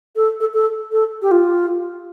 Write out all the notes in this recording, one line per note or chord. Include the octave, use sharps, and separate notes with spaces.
A4
A4
A4
A4
G4
F4